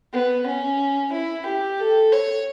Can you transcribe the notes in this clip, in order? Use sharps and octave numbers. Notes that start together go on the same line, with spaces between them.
B3
C#4
E4
G4
A4
C#5